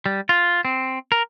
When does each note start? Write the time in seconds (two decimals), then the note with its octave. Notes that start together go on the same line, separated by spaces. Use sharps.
0.06 G3
0.29 F4
0.65 C4
1.12 A#4